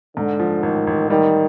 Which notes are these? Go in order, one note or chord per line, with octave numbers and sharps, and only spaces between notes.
G#2 D3
F3
A1 D#3
A1
D#3 G3